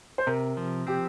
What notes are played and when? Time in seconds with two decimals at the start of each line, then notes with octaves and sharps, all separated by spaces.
0.18 C5
0.27 C3 A#4
0.57 F3
0.87 C4 G4